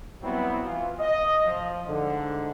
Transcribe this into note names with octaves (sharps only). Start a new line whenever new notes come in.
F#3 G3 B3 C4 E4
E3 F4
D#5
F3
G#2 D3